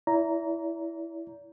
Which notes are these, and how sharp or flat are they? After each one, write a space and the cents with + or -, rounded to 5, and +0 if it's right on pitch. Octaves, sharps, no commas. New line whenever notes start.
E4 +0 D5 -40 A#5 +0